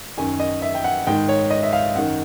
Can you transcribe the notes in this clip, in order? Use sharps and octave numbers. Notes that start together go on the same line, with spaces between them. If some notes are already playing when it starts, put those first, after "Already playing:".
F#2 D#3 G#5
D#5
E5
G5
F#5
G#2 D#3 G5
C#5
D#5
E5
F5
F#2 D#3 F#5